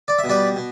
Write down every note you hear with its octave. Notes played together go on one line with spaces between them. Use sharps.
D5
E5
B2
G3 B4 D5
B2